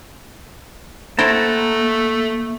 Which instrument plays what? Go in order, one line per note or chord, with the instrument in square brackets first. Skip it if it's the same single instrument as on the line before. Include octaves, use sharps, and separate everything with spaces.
[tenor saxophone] A3 [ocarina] A#3 [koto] E4 C5 G5 [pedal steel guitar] F#5 A5 A#5